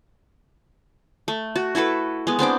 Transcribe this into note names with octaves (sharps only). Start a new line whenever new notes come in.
A3
F#4
E4 F#4 A4 B4
G#3 B3
B3 C4 D4 D6